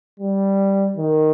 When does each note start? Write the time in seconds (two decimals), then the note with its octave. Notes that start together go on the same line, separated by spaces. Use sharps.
0.20 G3
0.97 D#3